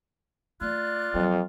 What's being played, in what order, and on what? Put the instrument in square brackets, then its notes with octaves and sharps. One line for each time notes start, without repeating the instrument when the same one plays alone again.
[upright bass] A3 [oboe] F4 [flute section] D5 F#6
[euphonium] F2 [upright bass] F#3